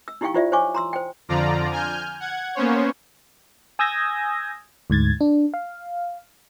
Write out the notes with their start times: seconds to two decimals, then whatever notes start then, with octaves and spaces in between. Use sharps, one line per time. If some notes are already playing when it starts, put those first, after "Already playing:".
0.08 E6
0.21 D#4 E4 G4 F5 G5 C#6
0.34 E4 F4 C5 D5 E5
0.52 C5 C#5 F5 G#5 C#6 D6
0.75 A#5 C6 E6
0.93 C5 G5
1.29 F2 D3 F3 F4 D5 A#5
1.71 G#5 F6 G6
2.20 F#5 G#6
2.55 A#3 B3 C#4 C5 C#5
3.79 G#5 D#6 E6 G6 G#6 A#6
4.90 D2 G#2 G#6 A6
5.21 D4
5.54 F5